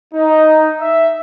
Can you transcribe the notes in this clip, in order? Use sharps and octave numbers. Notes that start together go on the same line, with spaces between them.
D#4
E5